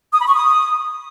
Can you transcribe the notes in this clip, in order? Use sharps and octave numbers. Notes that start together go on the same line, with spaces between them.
D#6
B5
C#6
D#6